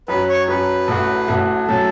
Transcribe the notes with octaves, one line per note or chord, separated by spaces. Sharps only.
F#2 F#3 C#4 F#4 B4
C#5
F#2 F#3 C#4 F#4 B4
A1 A2 A3 F#4
A1 A2 A3 F#4
A2 F#3 C#4 A4